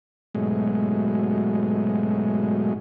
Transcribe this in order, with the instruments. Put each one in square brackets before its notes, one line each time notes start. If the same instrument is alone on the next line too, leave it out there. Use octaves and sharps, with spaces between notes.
[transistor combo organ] G#2 B2 F#3 G#3 A3